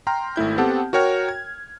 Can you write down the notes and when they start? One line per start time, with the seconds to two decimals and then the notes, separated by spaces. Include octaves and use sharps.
0.07 G5 A#5 C6 F6
0.36 G#1 A3 E4 G6
0.58 B3 C4 G4 A4 F#5 A5
0.93 F#4 A#4 C#5 G5 F6
1.28 G#6